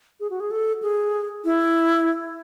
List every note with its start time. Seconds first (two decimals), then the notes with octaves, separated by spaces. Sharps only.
0.20 G#4
0.30 F#4
0.40 G#4
0.51 A4
0.82 G#4
1.45 E4